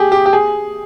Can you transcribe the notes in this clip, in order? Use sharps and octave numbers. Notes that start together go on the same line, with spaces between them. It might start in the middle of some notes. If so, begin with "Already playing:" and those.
Already playing: G4 G#4
G4
G4
G#4